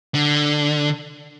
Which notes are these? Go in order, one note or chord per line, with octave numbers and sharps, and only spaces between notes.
D3